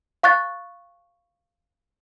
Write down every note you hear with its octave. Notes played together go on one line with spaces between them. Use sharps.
F5 C#6 F#6 A6